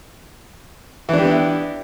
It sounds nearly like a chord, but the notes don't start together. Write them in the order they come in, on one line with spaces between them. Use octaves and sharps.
E3 D4 G4 B3 E4